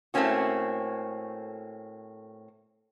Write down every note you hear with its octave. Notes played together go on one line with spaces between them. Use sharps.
A2 A3 A#3 C4 C#4 F#4